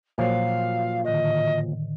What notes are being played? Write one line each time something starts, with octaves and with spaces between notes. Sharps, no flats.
A#2 F3 F#3 C5 C#5 F5
A2 D3 D#3 D#5